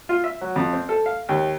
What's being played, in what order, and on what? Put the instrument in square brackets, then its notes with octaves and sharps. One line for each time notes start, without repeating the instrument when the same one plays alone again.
[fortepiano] F4
E5
F#3
F2
C4
A4
F5
D#2